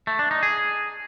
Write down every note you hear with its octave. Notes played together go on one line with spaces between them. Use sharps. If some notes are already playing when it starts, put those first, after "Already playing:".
A3
D4
D#4
G#4